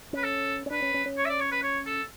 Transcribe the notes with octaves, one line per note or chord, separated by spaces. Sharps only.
C#4 B4
A4
C#4
D4 B4
C#4
C#4
C#4
C#5
E5
D5
C#5
B4
C#5
A4